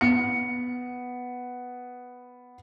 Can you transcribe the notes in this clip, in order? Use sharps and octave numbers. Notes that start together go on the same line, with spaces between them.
B3 C#7